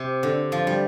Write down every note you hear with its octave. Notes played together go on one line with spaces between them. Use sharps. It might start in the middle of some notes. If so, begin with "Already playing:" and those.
Already playing: C3
D3
F3
G3